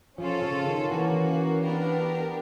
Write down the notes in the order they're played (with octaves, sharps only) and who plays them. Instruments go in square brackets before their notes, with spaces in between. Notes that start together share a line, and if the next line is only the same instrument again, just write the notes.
[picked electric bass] F3 [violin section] C#4 F4 A4
[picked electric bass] C#3
D#3
[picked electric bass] E3 [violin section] A#3 C#4 F#4
[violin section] B3 D4 G4 A#4